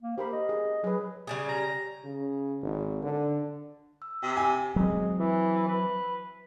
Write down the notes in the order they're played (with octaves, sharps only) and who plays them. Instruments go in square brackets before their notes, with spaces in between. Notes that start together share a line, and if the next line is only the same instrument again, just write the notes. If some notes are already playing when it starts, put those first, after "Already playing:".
[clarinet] A#3
[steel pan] G4 A#4 B5 [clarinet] C5
[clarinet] D#5
[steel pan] G#4
[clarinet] F#3 [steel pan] G#4 B4
[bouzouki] C#3 G3 G#4
[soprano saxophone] A#5
[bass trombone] C#3
G#1
D3
[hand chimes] E6
[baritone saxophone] C3 [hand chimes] G5
[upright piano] G#5
[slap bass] F#3 C4 [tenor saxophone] G#3
[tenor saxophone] E3
B4